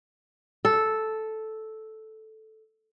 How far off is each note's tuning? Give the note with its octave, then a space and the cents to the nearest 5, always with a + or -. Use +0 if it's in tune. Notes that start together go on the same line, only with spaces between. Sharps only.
A4 -5